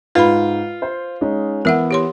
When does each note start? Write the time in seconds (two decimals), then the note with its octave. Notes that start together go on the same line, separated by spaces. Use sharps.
0.15 G#2 F4 B4 B5
0.82 C5
1.21 G#3 C#4 D#4
1.65 E3 B3 A#4 E5 F#5 E6
1.91 G4 C#5 C6